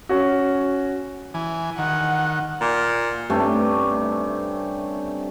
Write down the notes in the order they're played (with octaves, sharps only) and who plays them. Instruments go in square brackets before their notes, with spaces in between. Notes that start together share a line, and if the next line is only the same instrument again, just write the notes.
[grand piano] C#4 F#4
[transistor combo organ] E3 G#5
[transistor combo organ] D#3 [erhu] F#5
[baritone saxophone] A#2
[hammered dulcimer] G2 C3 A3 C#4